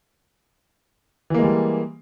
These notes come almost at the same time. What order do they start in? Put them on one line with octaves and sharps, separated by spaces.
E3 A#3 G#3 G3